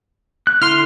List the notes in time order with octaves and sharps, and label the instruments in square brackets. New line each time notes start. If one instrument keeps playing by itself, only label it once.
[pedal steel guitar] F#6
[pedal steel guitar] D3 E4 [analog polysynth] C6 F6